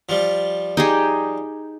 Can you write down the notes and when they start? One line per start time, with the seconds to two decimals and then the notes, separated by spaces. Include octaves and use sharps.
0.09 F3 G3
0.77 D#4 G4 G#4